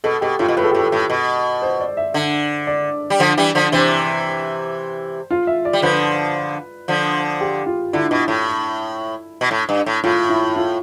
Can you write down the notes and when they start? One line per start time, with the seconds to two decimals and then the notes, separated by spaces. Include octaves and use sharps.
0.04 B2 A4
0.21 B2 G4
0.39 A2 F4
0.48 B2
0.57 A2 B4
0.64 A4
0.71 G4
0.75 A2 A4
0.92 A2
1.10 B2
1.62 C5
1.80 D5
1.97 E5
2.14 D3
2.67 D5
3.10 G3
3.20 D3 F3
3.37 E3 G3
3.55 D3 F3
3.72 C3 E3 C5
5.31 F4
5.47 E5
5.65 D5
5.73 G3
5.82 D3 F3 B4
6.88 D3 F3
7.41 G4
7.66 F4
7.93 D3 E4
8.11 B2
8.28 A2
9.41 B2
9.51 A2
9.69 G2
9.86 A2
10.04 A2 F4
10.29 E4
10.56 F4